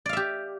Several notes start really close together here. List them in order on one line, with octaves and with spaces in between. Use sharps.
D5 F5 E5 G4